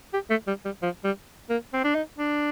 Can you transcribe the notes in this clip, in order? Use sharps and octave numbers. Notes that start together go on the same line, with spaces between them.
G4
A3
G3
G3
F3
G3
A#3
C4
D4
D#4
D4